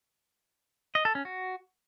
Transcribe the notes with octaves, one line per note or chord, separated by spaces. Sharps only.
D#5
A4
C#4
F#4